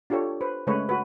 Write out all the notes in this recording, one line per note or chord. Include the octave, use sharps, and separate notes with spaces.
D4 F4 G4 A4 C#5
B4 C5
C#3 G#3 A3 B4 C#5
F#4 B4